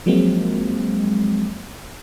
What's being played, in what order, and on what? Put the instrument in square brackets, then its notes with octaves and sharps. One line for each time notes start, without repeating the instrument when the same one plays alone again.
[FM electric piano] F3 F#3 G#3 A#3 C4